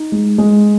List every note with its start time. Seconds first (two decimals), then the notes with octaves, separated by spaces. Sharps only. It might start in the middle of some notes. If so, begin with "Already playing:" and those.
Already playing: D#4
0.12 G#3
0.38 G#3